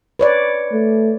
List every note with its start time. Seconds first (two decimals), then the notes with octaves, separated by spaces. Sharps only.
0.19 B4 C#5 D5
0.73 A3